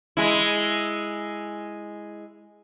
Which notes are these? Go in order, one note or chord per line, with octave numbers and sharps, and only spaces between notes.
G#3 E4